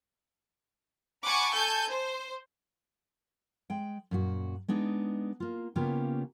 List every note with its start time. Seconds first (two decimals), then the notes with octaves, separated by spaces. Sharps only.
1.25 F#5 G#5 A5 B5 C#6 D6
1.55 A4 G#5 A5 G6
1.88 C5
3.70 G#3 G5
4.11 F#2 A#2 F#4
4.68 G#3 B3 D4 D#4
5.40 A#3 F4
5.76 C#3 A#3 B3 C#4 F4 G4